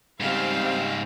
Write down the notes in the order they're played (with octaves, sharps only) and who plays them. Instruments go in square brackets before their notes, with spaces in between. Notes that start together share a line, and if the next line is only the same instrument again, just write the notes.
[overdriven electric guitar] G#2 C#3 [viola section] G3 C4 F5